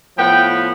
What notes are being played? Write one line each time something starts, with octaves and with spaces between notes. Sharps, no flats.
A2 F3 B3 G5